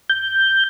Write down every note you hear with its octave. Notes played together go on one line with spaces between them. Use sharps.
G6